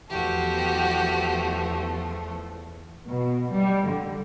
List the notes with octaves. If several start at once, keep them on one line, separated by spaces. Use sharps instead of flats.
E2 F3 A3 F#4 G4
B2
G3
D3